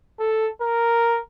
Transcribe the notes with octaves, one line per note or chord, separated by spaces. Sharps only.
A4
A#4